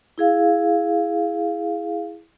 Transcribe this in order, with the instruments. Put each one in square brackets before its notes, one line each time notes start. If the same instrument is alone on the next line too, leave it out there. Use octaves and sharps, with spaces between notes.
[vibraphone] E4 G#4 F5